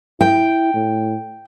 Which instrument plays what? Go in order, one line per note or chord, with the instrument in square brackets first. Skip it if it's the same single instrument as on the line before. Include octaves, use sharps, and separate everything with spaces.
[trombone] E4 [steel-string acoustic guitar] G5
[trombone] A2